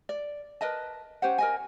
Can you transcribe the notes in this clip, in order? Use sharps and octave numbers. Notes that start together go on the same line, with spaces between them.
D5
A#4 B4 D#5 A5
C#4 G4 C5 F#5
A#4 D#5 G#5